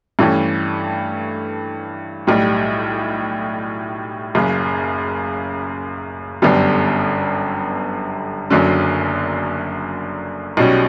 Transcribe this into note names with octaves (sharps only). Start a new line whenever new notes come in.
G2 E3 A3 C#4 G4
B1 A2 G3
F#1 F#2 C#3
G1 F#2 D3 G3 B3
F#1 F#2 D3 F#3 C#4
B1 B2 G3 C#4 F#4